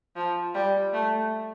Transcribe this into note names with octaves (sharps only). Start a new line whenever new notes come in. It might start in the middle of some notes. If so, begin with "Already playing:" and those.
F3
G3
A3